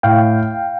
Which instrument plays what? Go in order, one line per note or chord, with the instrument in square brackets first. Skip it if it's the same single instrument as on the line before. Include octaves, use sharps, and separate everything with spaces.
[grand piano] A2 [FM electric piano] F5 G5